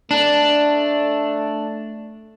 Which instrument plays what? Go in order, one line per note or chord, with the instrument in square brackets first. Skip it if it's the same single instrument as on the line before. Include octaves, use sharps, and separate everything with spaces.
[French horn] A3 [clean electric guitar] D4